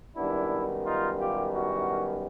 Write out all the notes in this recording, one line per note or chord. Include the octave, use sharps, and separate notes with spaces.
F#2 D#3 G3 B3 D4 E4
D#4 F4
F4 G4
E4 F#4